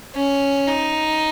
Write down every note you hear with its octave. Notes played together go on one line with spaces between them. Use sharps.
C#4
D#4